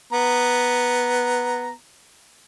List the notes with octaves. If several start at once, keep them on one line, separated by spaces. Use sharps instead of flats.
B3 A#5